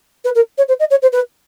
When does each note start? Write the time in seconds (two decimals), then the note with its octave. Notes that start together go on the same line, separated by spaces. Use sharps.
0.24 B4
0.35 A#4
0.58 C#5
0.68 C5
0.79 D#5
0.90 C#5
1.02 C5
1.12 B4